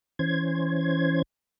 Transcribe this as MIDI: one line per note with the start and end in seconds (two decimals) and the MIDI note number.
0.19 1.22 52
0.19 1.22 61
0.19 1.22 72
0.19 1.22 92